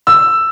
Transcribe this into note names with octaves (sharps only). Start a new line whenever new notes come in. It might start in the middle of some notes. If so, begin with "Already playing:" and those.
E6